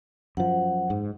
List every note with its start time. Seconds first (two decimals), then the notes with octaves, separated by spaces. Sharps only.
0.37 F#2 F3 F#5
0.90 G#2